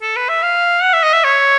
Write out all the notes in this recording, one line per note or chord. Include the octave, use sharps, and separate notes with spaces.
A4
B4
E5
F5
F#5
E5
D#5
E5
C#5